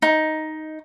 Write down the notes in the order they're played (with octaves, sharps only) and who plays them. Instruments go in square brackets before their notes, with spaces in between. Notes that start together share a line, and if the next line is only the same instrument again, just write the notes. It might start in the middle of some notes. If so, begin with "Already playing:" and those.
[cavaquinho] D#4